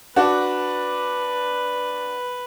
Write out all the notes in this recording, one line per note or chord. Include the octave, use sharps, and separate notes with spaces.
D4 F#4 B4